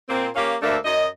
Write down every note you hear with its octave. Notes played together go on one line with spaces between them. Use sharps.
A#2 A#3 C4
A#3 C#4 G4 F5
D2 A3 A#3 D4 E5
F#2 D#5